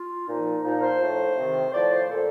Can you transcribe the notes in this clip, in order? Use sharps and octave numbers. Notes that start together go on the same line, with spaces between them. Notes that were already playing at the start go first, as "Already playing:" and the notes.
Already playing: F4
A#2 F3 D#4
A#2 F3 D#4
A#4
C5
A2 F3
C3 D#3
A2 F3 D5
C5
A#2 F3 A4